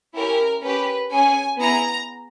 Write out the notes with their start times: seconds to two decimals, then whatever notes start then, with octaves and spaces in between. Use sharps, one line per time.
0.14 C#4 E4 G4 A#4
0.62 C#4 G4 B4
1.10 C#4 G#4 G#5
1.58 B3 E4 G#4 A#5